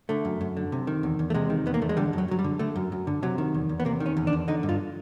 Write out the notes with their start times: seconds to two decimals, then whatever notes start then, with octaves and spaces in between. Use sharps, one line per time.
0.09 D3 A3
0.25 F#2
0.41 F#2
0.57 D3
0.72 C3
0.87 D#3
1.03 E2
1.19 E2
1.30 A3
1.34 C3 G#3
1.50 D#3
1.66 E2 B3
1.74 A#3
1.82 E2 A3
1.89 G#3
1.97 D3 G3
2.13 F#2 F#3
2.28 F#2 F#3
2.39 G3
2.44 D3
2.59 D3 A3
2.76 F#2
2.92 F#2
3.07 D3
3.23 C3 F#3
3.38 D#3
3.54 E2
3.69 E2
3.80 B3
3.85 C3 A#3
4.00 D#3
4.06 C#4
4.17 E2
4.27 D4
4.33 E2
4.48 D3 D#4
4.63 G2
4.69 F4